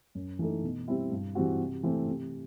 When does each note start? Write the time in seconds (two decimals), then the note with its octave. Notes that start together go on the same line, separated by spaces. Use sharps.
0.15 F#2
0.39 E3 A3 D#4 A4
0.64 B2
0.88 G3 C4 E4
1.12 G2
1.35 E3 G3 C4 F#4
1.60 C3
1.83 E3 A3 C4
2.07 C3